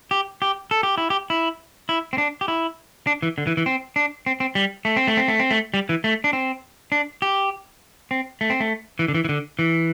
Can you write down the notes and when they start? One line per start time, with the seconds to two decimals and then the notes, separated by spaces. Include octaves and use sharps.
0.11 G4
0.42 G4
0.71 A4
0.83 G4
0.98 E4
1.10 G4
1.30 E4
1.89 E4
2.13 C4
2.18 D4
2.41 G4
2.48 E4
3.07 D4
3.22 E3
3.38 D3
3.47 E3
3.57 E3
3.66 C4
3.96 D4
4.26 C4
4.40 C4
4.55 G3
4.85 A3
4.97 C4
5.07 A3
5.17 C4
5.28 A3
5.40 C4
5.51 A3
5.74 G3
5.89 E3
6.04 A3
6.24 D4
6.33 C4
6.92 D4
7.22 G4
8.11 C4
8.41 A3
8.50 C4
8.60 A3
8.99 E3
9.08 D3
9.14 E3
9.25 E3
9.29 D3
9.59 E3